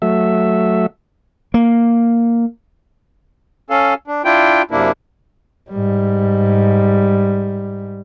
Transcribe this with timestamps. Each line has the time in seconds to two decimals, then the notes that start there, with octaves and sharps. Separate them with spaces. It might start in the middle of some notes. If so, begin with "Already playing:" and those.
0.02 F#3 A3 E5
1.54 A#3
3.70 C#4 A4 F5
4.08 D4
4.25 D4 E4 F4 G5
4.71 F#2 C3 A#3 D4 E4
5.70 G#2 G3